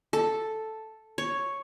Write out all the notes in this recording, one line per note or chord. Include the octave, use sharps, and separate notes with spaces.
A4
C#5